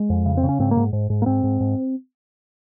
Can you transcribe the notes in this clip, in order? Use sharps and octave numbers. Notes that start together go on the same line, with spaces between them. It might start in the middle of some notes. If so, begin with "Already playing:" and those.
Already playing: G#3
F2
C#3
C4
C#3
C#4
G#2 C4
A#3
G#2
G#2
G#2
A#3
G#2 C4
G#2
G#2